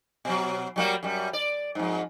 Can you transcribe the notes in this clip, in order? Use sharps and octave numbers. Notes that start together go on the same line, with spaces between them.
B2 F#3
F#3 G3 A#3
F#2 G3
D5
F2 G#2